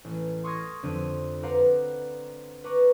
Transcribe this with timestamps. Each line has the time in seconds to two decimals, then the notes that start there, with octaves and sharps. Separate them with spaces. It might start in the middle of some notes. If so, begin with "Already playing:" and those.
0.05 A1
0.44 C6 C#6 D#6 F6 G#6 A#6
0.83 F2 D3 F3 C4 D#7
1.43 B4 C5 D5 F5 F#5 A#5
2.64 B4 A#5 C#6 D6